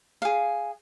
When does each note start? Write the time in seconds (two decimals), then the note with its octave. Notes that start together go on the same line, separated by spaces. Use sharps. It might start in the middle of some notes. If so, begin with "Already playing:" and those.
0.22 G#4 F5